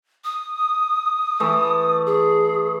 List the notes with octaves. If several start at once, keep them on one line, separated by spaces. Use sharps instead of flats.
D#6
E3 A3
G#4